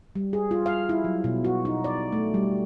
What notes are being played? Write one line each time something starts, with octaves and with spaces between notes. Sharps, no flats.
G3
G#4
F4
F5
E4
F#3
B2
F#4
D#4
D5
A3
G3